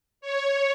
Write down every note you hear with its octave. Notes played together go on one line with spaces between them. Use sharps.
C#5